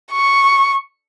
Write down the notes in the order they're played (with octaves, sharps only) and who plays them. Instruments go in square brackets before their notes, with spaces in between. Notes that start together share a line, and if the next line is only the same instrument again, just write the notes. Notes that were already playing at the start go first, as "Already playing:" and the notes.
[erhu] C#6